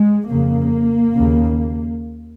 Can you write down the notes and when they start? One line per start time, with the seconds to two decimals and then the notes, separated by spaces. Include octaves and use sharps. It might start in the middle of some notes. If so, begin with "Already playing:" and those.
Already playing: G#3
0.30 F2 C#3 A#3
1.15 D#2 C#3